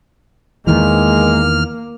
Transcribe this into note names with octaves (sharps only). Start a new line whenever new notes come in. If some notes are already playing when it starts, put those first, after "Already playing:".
E2 D#3 E3 G#3 A#3 F6